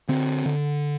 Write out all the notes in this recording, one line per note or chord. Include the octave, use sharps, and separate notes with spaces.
D3 C4
D3